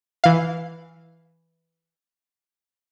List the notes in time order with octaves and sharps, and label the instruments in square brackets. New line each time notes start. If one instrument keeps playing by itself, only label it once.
[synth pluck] E3 F5